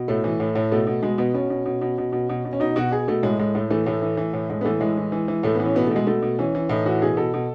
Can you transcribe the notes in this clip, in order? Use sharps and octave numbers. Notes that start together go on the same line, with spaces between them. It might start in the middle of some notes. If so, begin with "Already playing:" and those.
Already playing: B2
A2 A3
E3
A2
A2
B2 A3
B2
B2 G#3
B2 B3
B2 C#4
B2
B2
B2
B2
B2
B2
B2
C#4
B2 D#4
B2 F#4
B2 G#4
B2 A3
A2 G#3
A2 G#3
A2 A3
E3 A3
A2 A3
E3
E3
A2
A2 G#3
B3
E3 A3
A2 G#3
E3
E3
E3
A2 A3
B3
E3
C#4
B2 B3
A3
B2 G#3
B2 A3
B2
E3 C#4
E3
A2 D#4
E3 F#4
B2 G#4
B2 A4
B2